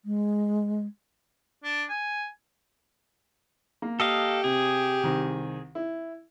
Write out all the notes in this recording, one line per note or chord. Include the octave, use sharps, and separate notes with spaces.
G#3
D4
G#5
A#3
G4 A4 D#5 F5
C3 G#4
C2 D#3
E4